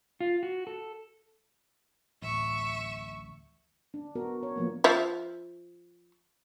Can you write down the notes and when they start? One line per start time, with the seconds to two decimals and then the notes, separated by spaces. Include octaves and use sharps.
0.21 F4
0.43 F#4
0.67 A4
2.22 D1 A1 E5 C#6
3.94 D4
4.15 B3 F#4 A#4
4.43 C#5
4.56 F3 A#3 B3
4.84 F3 E5